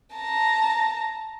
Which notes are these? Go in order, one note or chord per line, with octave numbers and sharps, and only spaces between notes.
A5 A#5